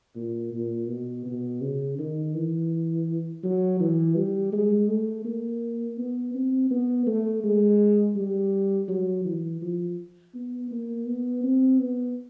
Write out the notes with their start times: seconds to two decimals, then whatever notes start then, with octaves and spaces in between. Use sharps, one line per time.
0.16 A#2
0.53 A#2
0.88 B2
1.26 B2
1.61 C#3
1.98 D#3
2.34 E3
3.43 F#3
3.80 E3
4.16 G3
4.52 G#3
4.88 A3
5.25 A#3
5.98 B3
6.34 C4
6.71 B3
7.07 A3
7.44 G#3
8.16 G3
8.88 F#3
9.25 E3
9.62 F3
10.35 B3
10.71 A#3
11.07 B3
11.44 C4
11.79 B3